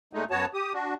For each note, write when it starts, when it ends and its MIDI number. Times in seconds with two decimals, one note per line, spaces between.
0.13 0.25 46
0.13 0.25 56
0.13 0.25 57
0.13 0.25 63
0.31 0.46 42
0.31 0.46 59
0.31 0.46 66
0.31 0.46 73
0.31 0.46 81
0.54 0.73 67
0.54 0.73 87
0.74 0.94 62
0.74 0.94 66